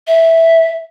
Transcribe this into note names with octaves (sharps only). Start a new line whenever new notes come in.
E5